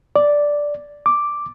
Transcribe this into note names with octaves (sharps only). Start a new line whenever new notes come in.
D5
D6